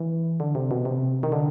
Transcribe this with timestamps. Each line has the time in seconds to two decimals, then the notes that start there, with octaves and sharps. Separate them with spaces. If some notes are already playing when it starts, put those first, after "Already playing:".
Already playing: E3
0.40 D3
0.55 C3
0.71 B2
0.85 C3
1.23 D#3
1.32 D3